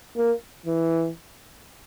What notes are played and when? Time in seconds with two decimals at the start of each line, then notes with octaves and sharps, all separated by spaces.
0.17 A#3
0.66 E3